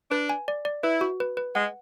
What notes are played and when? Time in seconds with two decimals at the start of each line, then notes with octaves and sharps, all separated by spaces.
0.11 D4 B4
0.29 G#5
0.48 D5
0.65 D5
0.83 E4 B4
1.01 F#4
1.20 B4
1.37 B4
1.55 G#3 F#5